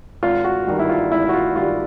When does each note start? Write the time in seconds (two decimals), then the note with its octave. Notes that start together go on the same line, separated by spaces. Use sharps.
0.23 G#1 F4
0.44 F#4
0.67 G2 D#3 G3
0.79 E4
0.90 F4
1.11 G#1 E4
1.29 F#4
1.34 F4
1.56 G2 D#3 G3 F4